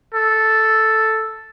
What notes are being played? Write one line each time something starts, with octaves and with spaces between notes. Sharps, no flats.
A4